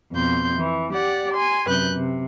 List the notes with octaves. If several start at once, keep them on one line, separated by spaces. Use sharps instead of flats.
F2 B2 C6 G6
E3
G4 D5 F#5
G#5 C6
F#2 C3 B4 F#6 G6
C3